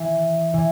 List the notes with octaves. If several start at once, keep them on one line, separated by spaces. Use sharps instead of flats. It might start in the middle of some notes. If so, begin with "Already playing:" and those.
Already playing: E3
E3